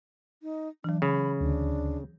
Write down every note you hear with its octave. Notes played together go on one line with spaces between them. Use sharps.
D#4
E3 F#3 D4
C#3 B5
D2 D4